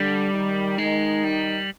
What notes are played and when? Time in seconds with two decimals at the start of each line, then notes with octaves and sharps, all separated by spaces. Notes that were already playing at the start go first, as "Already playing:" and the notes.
Already playing: D3 G3 D4
0.33 D#3 D#4
0.78 D#3 G#3 D#4
1.24 G3